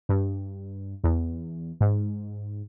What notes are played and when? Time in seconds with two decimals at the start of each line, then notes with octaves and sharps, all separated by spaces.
0.09 G2
1.04 E2
1.81 G#2